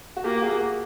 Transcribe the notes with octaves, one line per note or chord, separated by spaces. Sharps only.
F#4
A#3 F4 G4
F#4 G#4